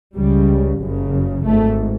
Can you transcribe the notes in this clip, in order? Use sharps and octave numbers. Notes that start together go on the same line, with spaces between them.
C#2 C#3 G3
F#1 F#2 C#3
G#1 G#2 A3